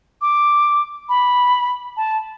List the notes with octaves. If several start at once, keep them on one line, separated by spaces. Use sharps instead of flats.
D6
B5
A5